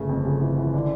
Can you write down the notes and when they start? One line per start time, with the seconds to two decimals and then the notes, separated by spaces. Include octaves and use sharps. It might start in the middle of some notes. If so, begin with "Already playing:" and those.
Already playing: G1 C#3 A3
0.09 F2
0.25 C#3
0.41 E3
0.58 E3
0.74 D3